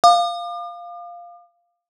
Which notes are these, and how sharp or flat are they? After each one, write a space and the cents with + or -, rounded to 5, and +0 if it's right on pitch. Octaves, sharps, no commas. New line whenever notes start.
F5 +0 D6 +45